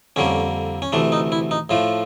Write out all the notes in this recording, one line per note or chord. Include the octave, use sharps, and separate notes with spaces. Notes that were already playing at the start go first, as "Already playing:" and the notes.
F2 D3 G3 A#3 C#4
C#4
D2 C3 E3 A3 D4
D#4
E4
D#4
A2 F3 A3 F4